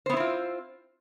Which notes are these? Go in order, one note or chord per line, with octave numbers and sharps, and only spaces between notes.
B3 C4 E4 F4 C5